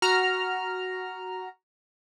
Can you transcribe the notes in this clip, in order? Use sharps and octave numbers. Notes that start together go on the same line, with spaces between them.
F#4 A#5 F6